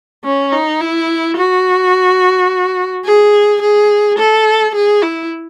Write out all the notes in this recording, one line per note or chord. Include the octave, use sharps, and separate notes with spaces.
C#4
D#4
E4
F#4
G#4
G#4
A4
G#4
E4